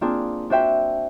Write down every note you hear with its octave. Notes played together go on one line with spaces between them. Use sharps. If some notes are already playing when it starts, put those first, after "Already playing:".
A#3 C4 D4 F4 G#4
D4 F#4 C5 E5 G5